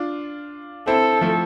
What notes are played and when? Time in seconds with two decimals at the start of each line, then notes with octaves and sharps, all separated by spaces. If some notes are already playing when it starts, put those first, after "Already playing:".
Already playing: D4 F4
0.87 C4 E4 A4
1.21 F3 A3